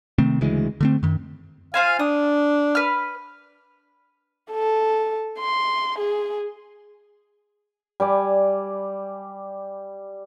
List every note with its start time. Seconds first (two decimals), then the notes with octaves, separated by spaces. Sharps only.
0.18 C3 D#3 A3 C4
0.41 D2 C#3 E3 G#3
0.81 D3 A3 C4
1.03 F#2 D#3
1.74 F4 C5 F5 G#5
1.99 D4 D#6
2.75 B4 F6
4.52 A4
5.40 C6
5.99 G#4
8.00 G3 D5 G#5